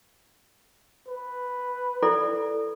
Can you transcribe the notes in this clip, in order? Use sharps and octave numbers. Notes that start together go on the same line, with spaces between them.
B4
E4 A4 D5